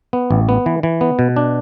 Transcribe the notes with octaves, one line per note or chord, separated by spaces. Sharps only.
B3
A1
B3
E3
E3
B3
B2
D4